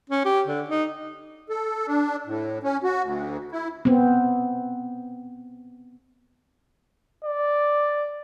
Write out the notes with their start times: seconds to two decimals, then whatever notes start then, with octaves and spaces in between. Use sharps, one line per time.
0.10 C#4
0.24 G4
0.47 D3
0.68 D#4
1.49 A4
1.87 D4
2.26 A2
2.63 C#4
2.84 F#4
3.03 D2
3.52 E4
3.85 B3 C4
7.25 D5